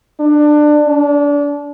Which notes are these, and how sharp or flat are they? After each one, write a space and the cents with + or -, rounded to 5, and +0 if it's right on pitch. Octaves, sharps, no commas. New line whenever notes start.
D4 +20
D4 -30